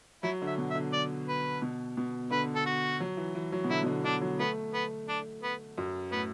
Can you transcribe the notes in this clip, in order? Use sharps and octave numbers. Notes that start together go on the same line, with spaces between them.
F#3 E4
D3 E5
B2
E5
D3
D5
B4
B2
B2
D3 B4
A4
F#4
F#3
E3
E3
F#3
B2
D3 E4
B2
D3
D3 D4
F#3
A3 B3
B3
D4
B3
F#2
A2 B3